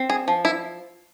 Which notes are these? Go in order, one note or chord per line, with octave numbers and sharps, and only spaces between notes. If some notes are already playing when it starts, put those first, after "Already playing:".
Already playing: C4
G#4
F3
E4